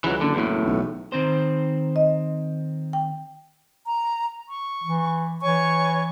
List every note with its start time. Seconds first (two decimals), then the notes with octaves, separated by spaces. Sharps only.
0.04 C#2 E3 F#3
0.21 F#1 D3
0.34 E2 A2
0.65 B1
1.12 D#3 C4 C5
1.96 D#5
2.93 G5
3.87 A#5
4.50 C#6
4.84 E3
5.42 E3 C#5 G#5 C#6